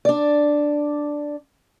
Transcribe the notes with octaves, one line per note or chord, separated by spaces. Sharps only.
D4 D5